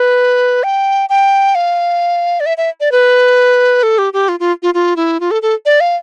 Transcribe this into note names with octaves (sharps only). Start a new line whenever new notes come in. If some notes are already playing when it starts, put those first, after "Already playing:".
Already playing: B4
G5
G5
F5
D5
E5
E5
D5
B4
A4
G4
G4
F4
F4
F4
F4
E4
F4
A4
A4
D5
F5